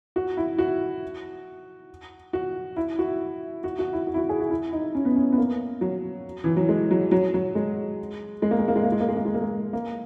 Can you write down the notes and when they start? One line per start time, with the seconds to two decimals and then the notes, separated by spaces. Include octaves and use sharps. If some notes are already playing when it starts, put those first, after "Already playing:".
0.16 F#4
0.37 E4
0.58 F#4
2.33 F#4
2.76 E4
2.99 F#4
3.64 F#4
3.79 F#4
3.93 E4
4.07 F#4
4.14 E4
4.18 F#4
4.29 G#4
4.40 F#4
4.50 E4
4.73 D#4
4.95 C#4
5.05 B3
5.16 C#4
5.32 B3
5.38 A#3
5.81 F#3
6.44 E3
6.57 F#3
6.69 G#3
6.91 F#3
7.11 F#3
7.34 F#3
7.55 G#3
8.42 G#3
8.51 A#3
8.58 G#3
8.68 A#3
8.76 G#3
8.83 A#3
8.92 G#3
9.00 A#3
9.09 G#3
9.16 A#3
9.25 G#3
9.34 A#3
9.42 G#3
9.73 A#3